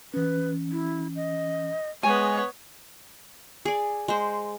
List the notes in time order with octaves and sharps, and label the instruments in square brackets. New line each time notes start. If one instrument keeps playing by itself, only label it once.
[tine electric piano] E3 C#4 [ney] B4
[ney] E4
D#5
[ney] G#3 [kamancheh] B3 C#5 [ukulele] G#5
[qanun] G#4 D5
G#3 C5